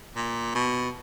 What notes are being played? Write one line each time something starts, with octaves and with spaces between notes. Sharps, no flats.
A#2
B2